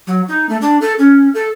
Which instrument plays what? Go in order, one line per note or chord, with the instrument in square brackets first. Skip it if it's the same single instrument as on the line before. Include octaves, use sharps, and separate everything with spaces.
[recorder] F#3
D#4
A3
D4
A4
C#4
A4